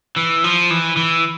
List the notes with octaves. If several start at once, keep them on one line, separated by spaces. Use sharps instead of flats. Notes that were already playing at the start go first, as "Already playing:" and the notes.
E3
F3
E3
E3